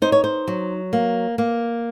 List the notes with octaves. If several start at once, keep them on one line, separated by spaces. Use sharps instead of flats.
D#4 C5
C#5
C5
F#3
A#3
A#3